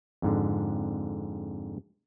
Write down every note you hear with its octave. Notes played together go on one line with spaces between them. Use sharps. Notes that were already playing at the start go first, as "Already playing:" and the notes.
F2 G#2 D3